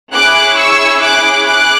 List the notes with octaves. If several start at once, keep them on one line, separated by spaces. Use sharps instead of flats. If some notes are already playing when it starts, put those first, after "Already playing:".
C#4 E4 G#4 D6 F#6
C#6 E6
D6 F#6
D6 F#6